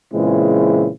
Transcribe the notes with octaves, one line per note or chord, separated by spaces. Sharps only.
A#2 C#3 E3 G#3 C4 E4